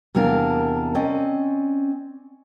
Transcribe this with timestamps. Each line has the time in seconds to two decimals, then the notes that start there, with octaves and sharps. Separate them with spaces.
0.15 E2 C3 A#3 D4 A#4 D5
0.95 C4 C#4 D5 D#5